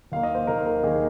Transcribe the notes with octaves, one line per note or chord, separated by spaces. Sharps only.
D#2 D#3 A#3 F5
D#5
C5
D#2 D#3 A#3 A#4
A#4
D#2 D#3 A#3 G#4